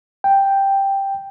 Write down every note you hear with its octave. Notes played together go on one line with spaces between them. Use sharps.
G5